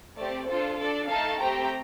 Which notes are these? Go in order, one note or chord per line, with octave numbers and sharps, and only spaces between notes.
A3 C4 G4 D5
D4 F4 A4 C5
D4 A4 D5
A3 D#4 A4 F5 A5
A3 C4 G4 G5 A#5